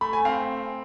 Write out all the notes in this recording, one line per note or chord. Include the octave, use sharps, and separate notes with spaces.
A3 B5
G#5
C4 F5